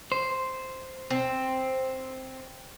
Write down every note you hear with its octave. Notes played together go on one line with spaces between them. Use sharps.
C5
C4